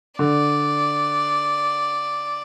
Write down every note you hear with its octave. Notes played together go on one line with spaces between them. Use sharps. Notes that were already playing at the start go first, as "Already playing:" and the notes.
D3 D5